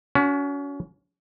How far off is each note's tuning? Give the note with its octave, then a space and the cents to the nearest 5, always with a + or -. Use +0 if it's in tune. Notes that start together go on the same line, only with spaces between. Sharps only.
C#4 +30 F#4 +0